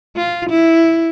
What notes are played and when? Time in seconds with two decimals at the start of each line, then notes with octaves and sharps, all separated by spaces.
0.17 F4
0.49 E4